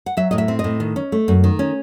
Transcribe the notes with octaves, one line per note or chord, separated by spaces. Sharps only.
F#5
F#3 E5
A2 D#5
E5
C4
D#5
A2
D#3
C#4
A3
F#2
D#3
C#4